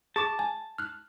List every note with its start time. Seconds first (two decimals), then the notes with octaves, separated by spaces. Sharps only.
0.16 G#4 A5 C#6 D6
0.39 G#5
0.78 F6 F#6